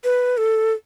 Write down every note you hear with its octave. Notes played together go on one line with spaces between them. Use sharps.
B4
A4